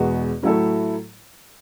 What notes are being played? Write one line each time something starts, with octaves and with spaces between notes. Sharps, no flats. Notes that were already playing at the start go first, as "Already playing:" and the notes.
Already playing: E2 B2 G#3 B3 F#4
A2 F#3 A3 E4 A4